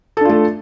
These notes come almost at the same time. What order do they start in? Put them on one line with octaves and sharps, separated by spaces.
A4 D4 F4 A3